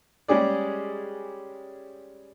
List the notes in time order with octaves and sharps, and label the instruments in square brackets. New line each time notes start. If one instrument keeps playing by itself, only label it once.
[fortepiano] G3 G#3 C#4 G#4 D5